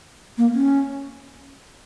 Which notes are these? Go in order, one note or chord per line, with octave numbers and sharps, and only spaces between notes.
A#3
C#4